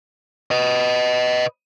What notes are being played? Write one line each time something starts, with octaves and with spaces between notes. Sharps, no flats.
B4 D#5